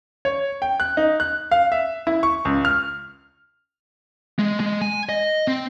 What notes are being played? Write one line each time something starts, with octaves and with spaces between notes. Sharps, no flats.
C#5
G5
F#6
D#4
F#6
F5
E5
E4
C#6
C#2
F6
G#3
G#3
G#5
D#5
C4